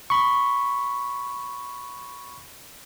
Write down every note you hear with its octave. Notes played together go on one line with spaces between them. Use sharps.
B5 C#6